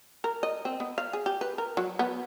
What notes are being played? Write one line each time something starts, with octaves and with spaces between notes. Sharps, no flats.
A#4
D#5
C4
B3
F5
G#4
G4
B4
A#4
F#3
B3